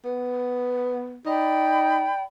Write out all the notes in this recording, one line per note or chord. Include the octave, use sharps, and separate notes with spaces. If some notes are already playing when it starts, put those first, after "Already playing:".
B3
D#4 D5 G5 B5